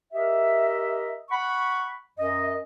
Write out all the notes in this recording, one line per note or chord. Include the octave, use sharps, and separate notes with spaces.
G4 A#4 D#5 E5
F#5 B5 C#6
F#2 D#5